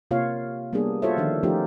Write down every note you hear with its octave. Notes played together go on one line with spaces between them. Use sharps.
C3 A#3 F4 C#5 F5
G3 A#3 B3 D4 G#4
F4 F#4 A4 C5 C#5 E5
D3 D#3 F3 D4
F3 A3 C#4 D#4 F4 G4